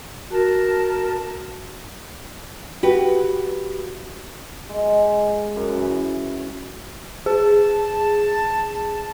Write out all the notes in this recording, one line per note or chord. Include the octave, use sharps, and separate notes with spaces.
F#4 A#4 A5
F#4 G4 B4
G#3
F#2
E3
G#4 A5